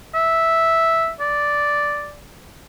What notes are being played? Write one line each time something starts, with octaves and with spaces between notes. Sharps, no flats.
E5
D5